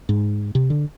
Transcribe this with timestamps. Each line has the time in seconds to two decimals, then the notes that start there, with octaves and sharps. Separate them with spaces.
0.09 G#2
0.55 C3
0.70 D3